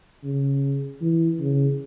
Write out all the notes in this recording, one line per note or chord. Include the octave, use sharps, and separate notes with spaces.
C#3
E3
C#3